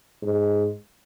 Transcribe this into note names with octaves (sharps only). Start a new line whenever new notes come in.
G#2